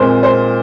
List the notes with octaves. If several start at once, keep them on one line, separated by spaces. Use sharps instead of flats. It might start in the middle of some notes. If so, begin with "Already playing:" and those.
Already playing: A#2 G#3 C4 A#4 C5
C5